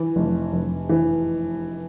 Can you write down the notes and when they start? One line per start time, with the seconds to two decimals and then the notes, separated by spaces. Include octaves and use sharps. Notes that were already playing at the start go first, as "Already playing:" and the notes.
Already playing: E3
0.16 F1
0.52 F1
0.89 E3